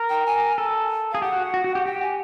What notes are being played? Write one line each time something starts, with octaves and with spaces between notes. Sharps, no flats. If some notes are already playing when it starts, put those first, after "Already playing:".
Already playing: A#4
G5
G#5
A4
G#4 F5
G4 F#5
F#4
F#4
F#4
G4
G4 G5
G#5